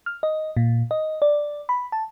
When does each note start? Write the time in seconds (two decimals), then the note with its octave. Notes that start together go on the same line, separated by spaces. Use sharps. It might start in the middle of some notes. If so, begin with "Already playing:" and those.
0.06 F6
0.23 D#5
0.57 A#2
0.91 D#5
1.22 D5
1.69 B5
1.92 A5